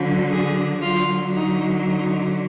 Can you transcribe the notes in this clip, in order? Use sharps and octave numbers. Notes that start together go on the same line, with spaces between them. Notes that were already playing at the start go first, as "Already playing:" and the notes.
Already playing: D3 F#3
G#4
D3 F#3 F4
D#4
D#4